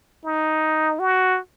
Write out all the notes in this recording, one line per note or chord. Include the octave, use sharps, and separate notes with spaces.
D#4
F#4